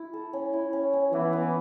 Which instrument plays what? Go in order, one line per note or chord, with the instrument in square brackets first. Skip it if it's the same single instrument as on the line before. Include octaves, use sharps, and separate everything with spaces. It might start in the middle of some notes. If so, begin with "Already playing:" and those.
Already playing: [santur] E4
A4
C#4
E4
C#4
C#4
[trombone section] E3 [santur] B3
[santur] B3